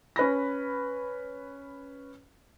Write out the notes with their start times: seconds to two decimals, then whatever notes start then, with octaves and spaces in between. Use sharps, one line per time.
0.16 C#4 B4 B5 A#6